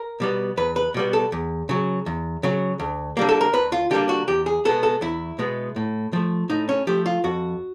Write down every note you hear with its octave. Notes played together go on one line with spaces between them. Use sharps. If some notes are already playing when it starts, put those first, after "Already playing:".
Already playing: A#4
B2 G3 B3
E2 B4
B4
B2 G3 B3
A4
E2
C#3 F#3
E2
C#3 F#3
D2
D3 G3 A#3
A4
A#4
D2 B4
F4
D3 G3 A#3 G4
F#4
E2 G4
G#4
B2 G#3 B3 A4
A4
E2 E4
B2 G#3 B3
A2
F3 A3
A2 D#4
C#4
F3 A3 G4
F4
F2 F#4